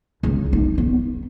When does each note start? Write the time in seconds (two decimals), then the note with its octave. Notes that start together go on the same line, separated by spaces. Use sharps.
0.23 C#2
0.53 D#4
0.78 B3